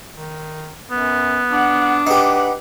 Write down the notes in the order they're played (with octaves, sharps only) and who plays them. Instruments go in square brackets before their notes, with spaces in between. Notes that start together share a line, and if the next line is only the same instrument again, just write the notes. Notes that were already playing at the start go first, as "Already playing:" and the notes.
[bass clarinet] D#3
[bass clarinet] F#2 [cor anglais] B3
[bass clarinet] D4 [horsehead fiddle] F#5
[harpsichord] D#4 G4 [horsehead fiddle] B4 F#5